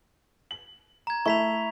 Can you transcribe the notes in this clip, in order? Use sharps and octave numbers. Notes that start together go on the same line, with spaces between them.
F#7
A#5 G#6
A3 E4 C#6 B6 F7